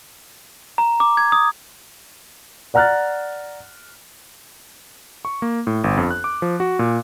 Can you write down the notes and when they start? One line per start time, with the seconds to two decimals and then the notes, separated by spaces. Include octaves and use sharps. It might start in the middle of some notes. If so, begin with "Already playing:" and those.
0.78 A#5
1.00 D6
1.17 G#6
1.32 D#6
2.74 D5 F#5 A#5 F6 F#6 A6
5.25 C#6
5.42 A#3
5.67 A2
5.84 G1
5.97 F2
6.11 F#6
6.24 D6
6.42 F3
6.60 F#4
6.79 A#2